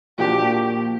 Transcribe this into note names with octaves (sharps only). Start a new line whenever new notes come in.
A#2 F3 A#3 D4 F#4 G4